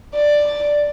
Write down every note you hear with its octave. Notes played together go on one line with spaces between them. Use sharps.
D5